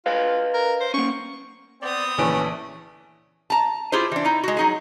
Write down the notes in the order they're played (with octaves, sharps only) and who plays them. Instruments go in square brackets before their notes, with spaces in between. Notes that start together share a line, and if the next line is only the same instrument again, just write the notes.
[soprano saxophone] F4 [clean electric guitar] B4 D#5 F5
[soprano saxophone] A#4
C5
[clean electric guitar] A#3 C#4 [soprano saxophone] C#6
[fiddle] B3 D#6 [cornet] C4 [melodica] D5
[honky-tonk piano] A#1 E3 D7 [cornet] A3 [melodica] C#4
[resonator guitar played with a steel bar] A5 A#5
E4 F4 G4 G#4 C5
E3 D4
D#4 E4
G#3 F#4
F#3 D#4 G#4